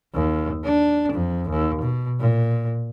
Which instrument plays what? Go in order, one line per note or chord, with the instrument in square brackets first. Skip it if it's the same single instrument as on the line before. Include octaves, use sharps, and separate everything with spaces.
[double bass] D#2
D4
F2
D#2
B2
A#2